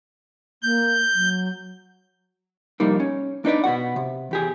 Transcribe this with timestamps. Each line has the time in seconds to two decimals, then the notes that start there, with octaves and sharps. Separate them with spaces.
0.63 A#3 G6
1.14 F#3
2.80 C2 F2 G3 A#3 D#4
3.00 C#4
3.45 D4 D#4 B4 D5
3.64 B2 B3 F#4 F#5
3.96 C3
4.31 E2 G4 G#4